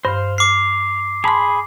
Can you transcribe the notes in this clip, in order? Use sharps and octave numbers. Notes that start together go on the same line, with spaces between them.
G2 C5 F5
D6 F6 C7
G#4 A5 B5 C6